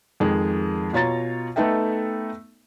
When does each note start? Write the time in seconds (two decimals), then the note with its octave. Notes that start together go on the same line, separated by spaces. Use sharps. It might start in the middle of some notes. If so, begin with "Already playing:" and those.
0.20 F2 D#3 G#3
0.93 B2 F4 C#5 A#5 A6
1.56 A3 B3 D#4 A4 E5 G5